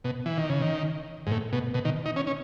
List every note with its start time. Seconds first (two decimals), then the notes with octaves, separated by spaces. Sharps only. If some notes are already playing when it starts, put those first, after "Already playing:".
0.04 B2
0.26 E3
0.38 D#3
0.49 C#3
0.62 D#3
1.27 G#2
1.31 A2
1.53 B2
1.74 B2
1.85 D#3
2.06 D#4
2.16 C#4
2.27 C#4